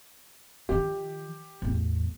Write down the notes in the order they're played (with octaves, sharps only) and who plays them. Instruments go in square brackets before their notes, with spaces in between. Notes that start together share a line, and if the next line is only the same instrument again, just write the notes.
[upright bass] D#3 F3 [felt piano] G4
[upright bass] A1 E2